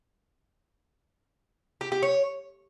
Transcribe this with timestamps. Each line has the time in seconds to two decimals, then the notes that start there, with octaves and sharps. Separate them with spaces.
1.81 G4
1.92 G4
2.03 C#5